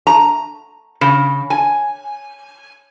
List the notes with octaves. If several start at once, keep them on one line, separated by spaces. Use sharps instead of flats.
A#5
C#3
G#5